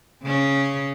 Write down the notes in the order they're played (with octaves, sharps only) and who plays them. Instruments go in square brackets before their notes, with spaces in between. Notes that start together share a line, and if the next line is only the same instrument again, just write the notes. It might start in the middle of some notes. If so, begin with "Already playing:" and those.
[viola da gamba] C#3 C#4